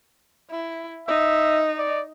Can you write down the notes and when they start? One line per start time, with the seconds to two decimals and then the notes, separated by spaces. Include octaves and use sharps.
0.50 E4
1.08 D#4 E5
1.78 D5